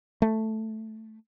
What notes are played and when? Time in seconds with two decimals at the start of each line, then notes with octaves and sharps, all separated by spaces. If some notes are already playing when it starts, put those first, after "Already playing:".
0.22 A3